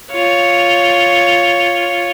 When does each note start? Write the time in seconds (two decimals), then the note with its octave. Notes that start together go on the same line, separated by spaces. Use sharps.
0.12 F4 C#5